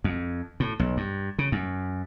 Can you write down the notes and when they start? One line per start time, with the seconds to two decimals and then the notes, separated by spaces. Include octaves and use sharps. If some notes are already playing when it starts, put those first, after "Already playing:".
0.04 F2
0.60 A2
0.79 B1
0.97 G2
1.39 C#3
1.52 F#2